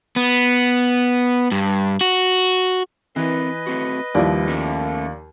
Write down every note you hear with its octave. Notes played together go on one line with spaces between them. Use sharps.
B3
G2
F#4
E3 C4 A#4 B4 D#5
A3 C4 F#4
D#2 F3 G3 E4 D5
A3 C#4 A#4